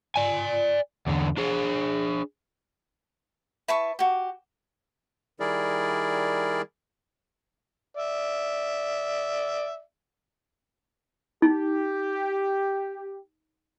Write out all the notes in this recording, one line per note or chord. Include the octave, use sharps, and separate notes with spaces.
D5 G#5
E2 D3
D4 G#4
E4 B4 A5 C#6
F#4 G4
D#3 G3 E4 G#4 A#4 D5
D5 E5
D#4 G4